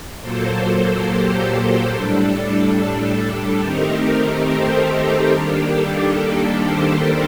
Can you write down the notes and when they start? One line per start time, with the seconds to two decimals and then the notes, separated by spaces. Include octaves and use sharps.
0.21 A#2 F#3 A#3 A4 C5
0.64 A4
1.06 G4
1.48 A4
1.91 A2 G3 D4
3.60 D#3 A3 C4 D#4 G4 A#4
4.45 A4 C5
4.88 G4 A#4
5.30 D#3 G3 A#3 D4 G4
5.73 A4
6.15 A4
6.58 A4 C5